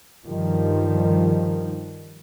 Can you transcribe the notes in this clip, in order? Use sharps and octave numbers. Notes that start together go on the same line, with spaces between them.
G2 D#3 F3 G3